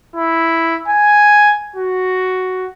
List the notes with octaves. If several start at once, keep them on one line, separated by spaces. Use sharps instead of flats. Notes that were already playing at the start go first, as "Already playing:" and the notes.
E4
G#5
F#4